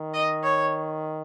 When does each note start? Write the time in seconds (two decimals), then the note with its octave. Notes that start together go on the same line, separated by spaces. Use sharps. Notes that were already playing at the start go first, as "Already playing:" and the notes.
Already playing: D#3
0.14 D#5
0.43 C#5